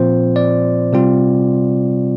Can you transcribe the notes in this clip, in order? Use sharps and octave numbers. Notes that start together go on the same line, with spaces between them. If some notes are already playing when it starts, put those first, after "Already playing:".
Already playing: A#2 F3 C4 F4 C5
D5
C3 G3 C4 F4